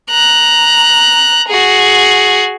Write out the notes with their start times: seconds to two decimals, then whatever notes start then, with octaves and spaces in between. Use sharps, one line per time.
0.11 A#5 F#6
1.48 F#4 G#4